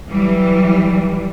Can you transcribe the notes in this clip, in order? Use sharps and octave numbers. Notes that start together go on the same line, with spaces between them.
E3 F#3 G3